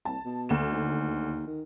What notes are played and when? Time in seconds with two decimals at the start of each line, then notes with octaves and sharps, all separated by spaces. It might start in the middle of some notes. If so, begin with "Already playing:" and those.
0.05 C2 A5
0.25 B2
0.49 D2 E7
0.72 D#2
1.47 D#3